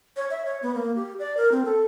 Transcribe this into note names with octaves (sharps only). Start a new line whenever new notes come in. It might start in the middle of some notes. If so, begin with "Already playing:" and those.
C#5
E5
C#5
B3
A#3
G4
D5
A#4
C4
A4